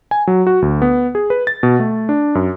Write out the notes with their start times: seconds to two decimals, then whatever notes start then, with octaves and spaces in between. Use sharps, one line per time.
0.11 G#5
0.27 F#3
0.47 F#4
0.62 D2
0.82 B3
1.15 G#4
1.30 B4
1.47 A6
1.63 B2
1.80 A3
2.09 D4
2.35 F#2